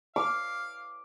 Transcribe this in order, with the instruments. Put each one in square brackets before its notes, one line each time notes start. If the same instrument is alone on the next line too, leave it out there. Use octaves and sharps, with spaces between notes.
[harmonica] F5 [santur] D6